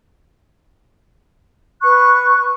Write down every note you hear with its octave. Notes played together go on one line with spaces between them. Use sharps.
B4 C#6 F#6